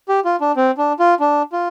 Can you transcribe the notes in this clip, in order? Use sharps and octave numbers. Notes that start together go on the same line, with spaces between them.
G4
F4
D4
C4
D4
F4
D4
F4